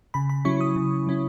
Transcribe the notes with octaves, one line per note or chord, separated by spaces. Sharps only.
C#3 B5
B5
F#3 C#4 E4 C#6
D#6
C#3
F#3 C#4 E4